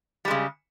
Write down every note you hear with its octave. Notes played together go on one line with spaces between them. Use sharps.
C#3 G3 G#3